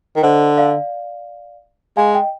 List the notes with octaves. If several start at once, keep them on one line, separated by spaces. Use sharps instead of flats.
D#3
D3 C5 D#5
D5 F5
G#3 F5 G#5
D#5 G5